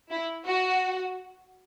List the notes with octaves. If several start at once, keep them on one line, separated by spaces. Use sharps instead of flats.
E4
F#4